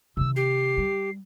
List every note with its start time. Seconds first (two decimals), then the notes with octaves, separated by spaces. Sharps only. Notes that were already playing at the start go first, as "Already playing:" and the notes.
0.17 C3 D#3 E6
0.36 G4 C7
0.77 G3